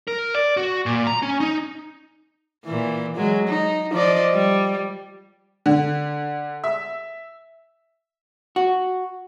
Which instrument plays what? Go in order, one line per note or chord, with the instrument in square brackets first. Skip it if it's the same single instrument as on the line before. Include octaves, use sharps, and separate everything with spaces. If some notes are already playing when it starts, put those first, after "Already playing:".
[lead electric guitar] A#4
D5
F#4
A#2
A#5
C#4
D#4
[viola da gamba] A#2 E3
F#3 G#3
D#4
F3 D5 D#5
G3
[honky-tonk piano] D3
E5
[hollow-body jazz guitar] F#4